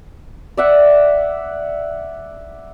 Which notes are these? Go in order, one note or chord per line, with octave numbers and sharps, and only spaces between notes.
D5 E5 F#5